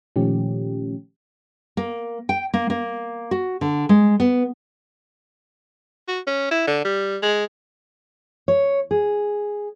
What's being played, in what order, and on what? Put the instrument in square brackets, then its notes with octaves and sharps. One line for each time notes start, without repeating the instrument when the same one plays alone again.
[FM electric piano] A#2 D#3 F3 A3 C#4 G4
[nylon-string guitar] A#3
G5
A#3
A#3
F#4
D3
G#3
B3
[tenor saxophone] F#4
C#4
E4
D3
G3
G#3
[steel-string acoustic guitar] C#5
G#4